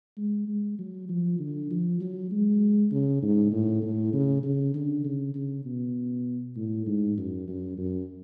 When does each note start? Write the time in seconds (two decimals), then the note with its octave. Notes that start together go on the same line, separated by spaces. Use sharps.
0.17 G#3
0.48 G#3
0.79 F#3
1.09 F3
1.39 D3
1.70 F3
2.00 F#3
2.31 G#3
2.91 C#3
3.22 G#2
3.52 A2
3.82 A2
4.13 C#3
4.43 C#3
4.74 D3
5.05 C#3
5.35 C#3
5.65 B2
6.56 A2
6.87 G#2
7.17 F#2
7.48 F#2
7.78 F#2